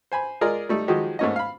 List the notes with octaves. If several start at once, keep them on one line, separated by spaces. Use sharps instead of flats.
C5 G#5 B5
G#3 F4 G#4 A#4 D5 D#5
G3 A3 D#4
D#3 F3 F#3 G#3 F#4 G4
G#2 A3 A#3 C#4 D#4 D#5
F5 B5